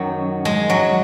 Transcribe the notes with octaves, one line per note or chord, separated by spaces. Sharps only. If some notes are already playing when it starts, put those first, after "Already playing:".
Already playing: F#2 D#3 F#3
G#3
F#3